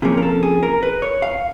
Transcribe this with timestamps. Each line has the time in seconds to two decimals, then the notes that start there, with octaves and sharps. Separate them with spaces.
0.02 C3 F3 A#3 C#4 G#4
0.17 A#4
0.22 A4
0.43 G#4
0.63 A#4
0.83 B4
1.02 C#5
1.22 F5